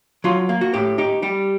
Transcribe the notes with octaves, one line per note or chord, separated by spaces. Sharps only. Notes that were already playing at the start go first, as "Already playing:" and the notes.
F#3 F4
A#3
F#4
A2 G4
D#4 G4
G3 G4